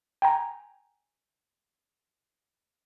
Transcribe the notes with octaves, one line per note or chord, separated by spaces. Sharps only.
G5 G#5 A#5